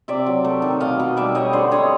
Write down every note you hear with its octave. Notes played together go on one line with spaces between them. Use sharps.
C3 D5 E5
F#3
A3
D#3
B2 D#5 F5
B2
G3 D5 E5
G3 C#5 D#5
D3 C5 D5
D3 C#5 D#5